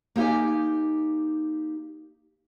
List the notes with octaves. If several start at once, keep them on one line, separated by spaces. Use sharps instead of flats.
A#3 D#4 G4 D#5 G#5